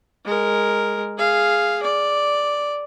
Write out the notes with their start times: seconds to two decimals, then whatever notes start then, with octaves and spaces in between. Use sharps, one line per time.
0.25 G#3 A#4
1.17 G#4 F5
1.83 D5